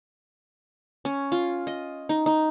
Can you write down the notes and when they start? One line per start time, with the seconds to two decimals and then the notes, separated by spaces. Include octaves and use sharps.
1.05 C#4
1.32 F4
1.67 D#5
2.09 D#4
2.26 D#4